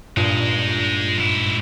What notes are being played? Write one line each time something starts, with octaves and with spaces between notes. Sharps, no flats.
G2 A#2 G#3 D#4
G#2 E4